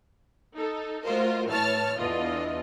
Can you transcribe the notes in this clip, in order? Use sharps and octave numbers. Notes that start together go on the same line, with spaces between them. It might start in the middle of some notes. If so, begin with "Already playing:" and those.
D#4 A4
A3 F4 F#4 A#4 C5 D#5
A2 E3 C#5 A5 F6
E2 D3 E3 F4 D#5